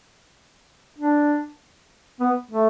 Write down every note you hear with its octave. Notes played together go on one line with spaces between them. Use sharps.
D4
B3
A3